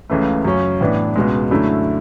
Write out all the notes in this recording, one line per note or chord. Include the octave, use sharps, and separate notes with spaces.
C#2 C#3 E3 A3
F#2 C#3 F#3 C#4
A2 E3 B3 D4
C#2 B2 G#3
F#2 D3 F#3 A3 E4